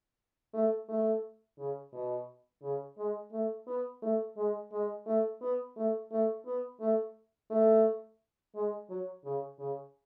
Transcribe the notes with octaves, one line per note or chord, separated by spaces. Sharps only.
A3
A3
C#3
B2
C#3
G#3
A3
B3
A3
G#3
G#3
A3
B3
A3
A3
B3
A3
A3
G#3
F#3
C#3
C#3